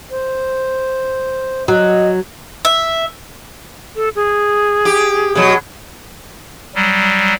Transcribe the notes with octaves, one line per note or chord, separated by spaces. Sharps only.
C5
F#3 D#5
E5
A4
G#4
G4
B2 F#3
F#3 G3